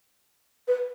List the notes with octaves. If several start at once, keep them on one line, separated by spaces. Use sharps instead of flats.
B4